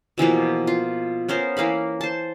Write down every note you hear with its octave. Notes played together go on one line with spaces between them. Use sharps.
B2 E3 F3 A#3
F4
B3 C#4 A#4 C5
E3 A#3 F5 B5
C5 A5